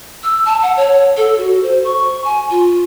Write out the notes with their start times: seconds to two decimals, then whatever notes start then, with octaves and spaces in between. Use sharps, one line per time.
0.24 E6
0.46 A5
0.62 F#5
0.77 C#5
1.17 A4
1.38 F#4
1.63 C5
1.84 C#6
2.24 G#5
2.50 F4